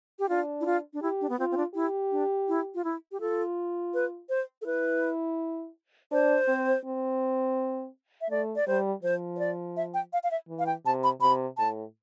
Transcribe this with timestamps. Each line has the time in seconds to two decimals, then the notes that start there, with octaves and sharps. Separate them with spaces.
0.19 G4
0.29 D4 F4
0.61 E4
0.66 F4
0.93 D4
1.02 E4 G4
1.21 D4
1.29 B3
1.39 C4 F4
1.51 C4
1.57 D4
1.74 E4 G4
2.11 D4
2.48 E4
2.75 F4
2.84 E4
3.12 G4
3.20 F4 A4
3.94 B4
4.29 C5
4.62 A4
4.66 E4 B4
6.11 D4 C5
6.48 C4
6.85 C4
8.21 E5
8.30 A3 D5
8.56 D5
8.67 G3 C5
9.03 F3 C5
9.36 C5
9.39 D5
9.77 E5
9.94 G5
10.13 F5
10.23 F5
10.31 E5
10.48 E3
10.59 F5
10.66 G5
10.86 C3 A5
11.03 B5
11.21 C3 B5
11.57 A2 A5